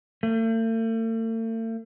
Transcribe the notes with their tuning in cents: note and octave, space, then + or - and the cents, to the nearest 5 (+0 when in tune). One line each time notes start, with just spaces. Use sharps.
A3 +45